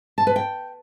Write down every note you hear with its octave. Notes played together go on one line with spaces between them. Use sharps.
A5
B4
G5